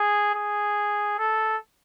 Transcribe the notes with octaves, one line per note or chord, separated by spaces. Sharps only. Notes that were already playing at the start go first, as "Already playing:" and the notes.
Already playing: G#4
G#4
A4